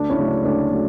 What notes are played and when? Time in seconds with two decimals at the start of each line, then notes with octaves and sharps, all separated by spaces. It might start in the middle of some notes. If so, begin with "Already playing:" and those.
Already playing: D2 D4
0.10 C#4 E4
0.19 C#3 F#3 A3
0.27 D4
0.45 D2 D4
0.71 F#3 A3